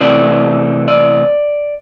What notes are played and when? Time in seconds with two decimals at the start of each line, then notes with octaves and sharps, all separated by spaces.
0.01 C3 E3 A3 C4 D5
0.88 D5